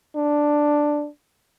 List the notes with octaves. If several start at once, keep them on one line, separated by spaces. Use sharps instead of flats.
D4